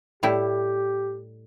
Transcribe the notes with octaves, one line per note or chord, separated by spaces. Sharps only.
A2 G3 E4 G4